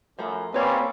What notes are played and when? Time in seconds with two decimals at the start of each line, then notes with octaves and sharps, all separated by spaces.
0.19 F#2 F3 A3 B5
0.54 G3 A#3 C4 C#4 B4 C#5 D5